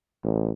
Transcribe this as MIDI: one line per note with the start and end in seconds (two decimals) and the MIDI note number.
0.24 0.51 33